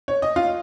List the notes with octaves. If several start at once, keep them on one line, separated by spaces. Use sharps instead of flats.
C#5
D#5
F4 F5